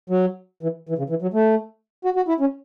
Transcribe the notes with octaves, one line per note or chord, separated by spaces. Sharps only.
F#3
E3
E3
C#3
E3
F#3
A3
F#4
F#4
E4
C#4